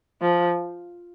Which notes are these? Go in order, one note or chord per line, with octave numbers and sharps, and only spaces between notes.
F3